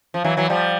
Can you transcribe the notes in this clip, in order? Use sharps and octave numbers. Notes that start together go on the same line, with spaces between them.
F3
E3 F#3
E3 F#3
F3 G3